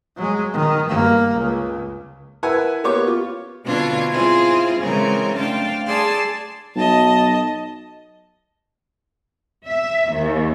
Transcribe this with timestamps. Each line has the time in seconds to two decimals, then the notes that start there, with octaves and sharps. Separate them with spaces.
0.16 F#3 G#3
0.54 D#3
0.89 G2 A#3
1.33 C#2
2.43 E4 A#4 B4 E5 F#5 G#5
2.84 A#3 B3 G4 C#5 C#6 D6
3.07 F4
3.66 B2 D3 C4 D4 F4 G#6
4.11 C4 E4 F4 G#4 C5
4.81 C#3 E3 G#3 C4 A#4
5.38 A3 D4 C5 F5 G5 A5
5.87 G#4 D5 A5 C6 E6
6.76 B1 D#5 A5
9.66 E5
10.12 D#2